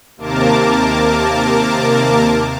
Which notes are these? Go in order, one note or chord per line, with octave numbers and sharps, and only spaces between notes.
D#2 C3 A#3 A#4 A5 D6